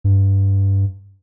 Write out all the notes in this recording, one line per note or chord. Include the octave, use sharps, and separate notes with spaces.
G2